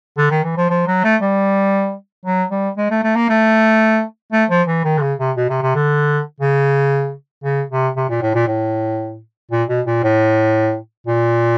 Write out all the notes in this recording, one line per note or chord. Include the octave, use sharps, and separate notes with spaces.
D3
D#3
E3
F3
F3
F#3
A3
G3
F#3
G3
G#3
A3
A3
A#3
A3
A3
F3
E3
D#3
D3
C#3
C3
B2
C3
C3
D3
C#3
C#3
C3
C3
A#2
A2
A#2
A2
A#2
B2
A#2
A2
A#2